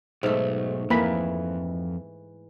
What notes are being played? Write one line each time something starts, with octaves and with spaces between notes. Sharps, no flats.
B1 G#2 A3
F2 E3 A#3 B5